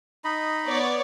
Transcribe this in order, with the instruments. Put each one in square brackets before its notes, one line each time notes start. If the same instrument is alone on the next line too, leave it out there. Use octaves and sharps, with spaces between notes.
[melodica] D#4 D#5 B5
[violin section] B3 C#5 D5